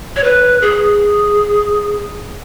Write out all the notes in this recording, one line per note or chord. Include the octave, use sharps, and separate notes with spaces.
C#5
B4
G#4